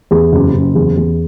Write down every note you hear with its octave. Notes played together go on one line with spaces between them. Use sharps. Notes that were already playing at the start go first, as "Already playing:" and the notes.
E2
F#1
F#1
E2
E2